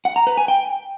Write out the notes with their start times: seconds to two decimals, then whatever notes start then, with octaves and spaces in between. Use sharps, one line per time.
0.05 F#5
0.16 A#5
0.27 B4
0.38 G#5
0.48 G5